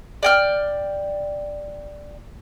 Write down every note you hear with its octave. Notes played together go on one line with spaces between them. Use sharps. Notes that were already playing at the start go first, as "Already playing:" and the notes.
D5 G5 F6